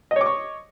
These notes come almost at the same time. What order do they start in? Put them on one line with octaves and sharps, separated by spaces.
D#5 C#5 D6 C#6